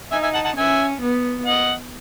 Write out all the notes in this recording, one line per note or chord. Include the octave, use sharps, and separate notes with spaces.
D#4 E5 G#5
E5 G#5
F#5 A5
F#5 A5
C#4 E5 G#5
B3
D#5 F#5